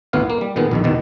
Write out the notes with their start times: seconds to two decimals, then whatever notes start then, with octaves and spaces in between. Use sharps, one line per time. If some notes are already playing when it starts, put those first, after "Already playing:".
0.13 G#1 D2 A2 B3 F4 F5
0.30 A#3
0.41 G3
0.56 A#2 D#3 G#3 B3
0.71 A#1 E2 D#3
0.84 E2 B2 D#3